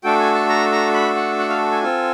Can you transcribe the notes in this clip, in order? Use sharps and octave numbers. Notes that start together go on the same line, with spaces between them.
A3 D4 F#4 A4 G5
G#5
A5
A#5
A#5
B5
F#5
F#5
F5
G#5
C4 F4 A4